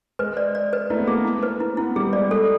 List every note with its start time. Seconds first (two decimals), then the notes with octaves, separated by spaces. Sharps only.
0.19 G#3 B4
0.37 D5
0.55 D5
0.73 B4
0.90 A3 E4
0.99 B3
1.07 A#3 G#4
1.25 E4
1.43 B4
1.60 E4
1.77 B3 E4
1.96 G3 G#4
2.13 G#3 D5
2.30 G#3 A4